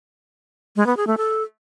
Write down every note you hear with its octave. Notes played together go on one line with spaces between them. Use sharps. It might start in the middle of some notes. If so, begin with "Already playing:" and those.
G#3
B3
G#4
A3
A4